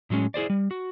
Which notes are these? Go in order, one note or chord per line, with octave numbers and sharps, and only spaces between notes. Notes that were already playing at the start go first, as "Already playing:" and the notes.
A2 F#3 G#3 C#4
E4 G#4 C5 D5
G3
F#4